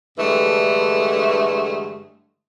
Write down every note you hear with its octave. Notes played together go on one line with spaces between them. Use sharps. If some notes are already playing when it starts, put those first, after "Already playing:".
G2 D3 E3 G#3 A3